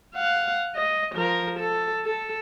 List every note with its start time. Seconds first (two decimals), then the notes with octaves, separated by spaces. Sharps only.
0.16 F5 F#5
0.76 D#5
1.15 F3 A#4
1.59 A4
2.05 A4